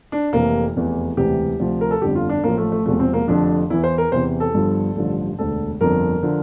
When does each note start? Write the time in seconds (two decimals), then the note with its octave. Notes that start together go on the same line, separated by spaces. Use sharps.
0.12 D4
0.33 F1 F2 C3 E3 A#3
0.75 F1 E2 E3
1.17 E1 D2 C3 E3 G4
1.60 D2 C3 F3
1.81 A#4
1.91 A4
2.01 G1 F2 D3 F3 G4
2.15 F4
2.29 D4
2.43 A1 A2 F3 A#3
2.58 A3
2.72 A3
2.86 E1 E2 C3 F3 A3
3.00 C4
3.14 A#3
3.27 F1 F2 D3 F3 D4
3.70 E2 E3 E4
3.84 C5
3.98 A#4
4.12 E2 C3 E3 C5
4.40 A4
4.54 G1 G2 D3 F3
4.96 A1 G2 D3 F3
5.38 E1 D2 D3 A4
5.81 G1 F2 D3 F3 A#4
6.22 D3 F3